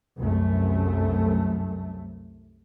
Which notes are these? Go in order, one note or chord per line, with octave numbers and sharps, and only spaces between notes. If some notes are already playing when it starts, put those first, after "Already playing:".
C2 F#2 A3